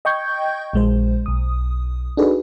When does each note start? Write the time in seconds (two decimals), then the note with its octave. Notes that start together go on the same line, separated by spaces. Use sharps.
0.05 D#5 G5 C#6 G6 G#6
0.73 A#1 G#3 C5
1.26 B1 D#6
2.17 D4 D#4 F#4 G#4 A4 B4